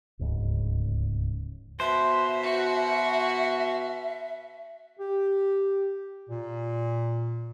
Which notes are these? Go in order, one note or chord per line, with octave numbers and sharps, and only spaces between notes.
D1 C#2 G#2 C#3
B2 C5 E5
F#4
G4
A#2